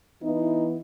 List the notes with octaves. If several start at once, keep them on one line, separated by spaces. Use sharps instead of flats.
E3 B3 D#4 E4